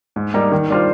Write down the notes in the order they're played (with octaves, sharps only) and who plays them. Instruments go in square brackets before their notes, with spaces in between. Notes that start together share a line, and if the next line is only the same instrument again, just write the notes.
[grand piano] G#2
G3 A#3 D#4
D#3
G3 D4 F4 C5